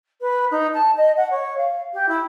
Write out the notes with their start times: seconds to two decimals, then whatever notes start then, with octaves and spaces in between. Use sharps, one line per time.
0.21 B4
0.51 D#4
0.74 A5
0.97 D#5
1.17 F#5
1.30 C#5
1.57 F5
1.93 G4
2.08 E4